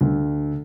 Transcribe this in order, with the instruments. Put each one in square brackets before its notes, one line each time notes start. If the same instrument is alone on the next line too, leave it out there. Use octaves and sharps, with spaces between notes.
[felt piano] D2